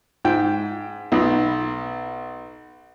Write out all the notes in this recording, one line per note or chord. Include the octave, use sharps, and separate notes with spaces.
G#2 G5
B1 B5